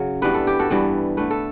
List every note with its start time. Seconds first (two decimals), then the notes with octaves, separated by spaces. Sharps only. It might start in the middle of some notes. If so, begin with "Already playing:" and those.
Already playing: C#3 F#3
0.22 G2 E3 G3 B3 B4
0.34 A4
0.47 G4
0.59 F#4 A4
0.70 G2 E3 G3 B3
1.17 D3 A3 B4
1.31 A4